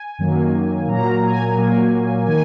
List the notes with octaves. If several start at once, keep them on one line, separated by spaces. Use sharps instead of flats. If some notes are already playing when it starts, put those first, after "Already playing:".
Already playing: G#5
F#2 D#3 F#3 A#3
A#2 F#3 A#3 A#5
G#5
A#2 F#3 A#3
D#3 A#3 G#5